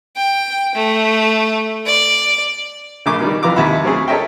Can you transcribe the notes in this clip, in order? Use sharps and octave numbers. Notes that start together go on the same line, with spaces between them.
G5
A3
D5
A#1 C#3 A3 A#4 G#5 D6
B2 D#3 G3
F2 E3 F4 A#5 D6
D#2 C3 E5 F#5 B5
F#3 A3 C4 C#4 G#4
A4 A#4 C#5 D#5 E5 G5